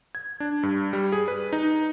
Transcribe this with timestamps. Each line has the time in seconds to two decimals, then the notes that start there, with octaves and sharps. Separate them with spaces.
0.15 G#6
0.40 D4
0.63 G2
0.93 G3
1.12 G#4
1.28 B4
1.53 D#4